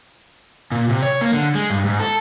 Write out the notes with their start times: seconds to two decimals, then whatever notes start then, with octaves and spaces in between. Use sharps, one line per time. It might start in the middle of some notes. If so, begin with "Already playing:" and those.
0.72 A#2
0.89 C3
1.03 C#5
1.21 A#3
1.34 D3
1.55 G#3
1.70 G2
1.85 G#2
1.99 A4